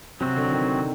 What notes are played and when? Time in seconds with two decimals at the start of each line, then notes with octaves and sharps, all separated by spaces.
0.20 C3 F#3 C4 F#4
0.36 D3
0.52 D#3